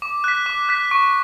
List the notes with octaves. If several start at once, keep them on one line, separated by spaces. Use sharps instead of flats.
D6
F#6 B6
D6
F#6 B6
C#6